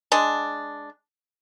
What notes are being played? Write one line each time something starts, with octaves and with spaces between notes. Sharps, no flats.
G#3 D4